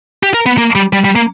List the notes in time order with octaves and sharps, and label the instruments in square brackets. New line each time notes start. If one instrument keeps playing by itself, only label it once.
[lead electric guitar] G4
A#4
B3
A#3
G3
G3
G3
A#3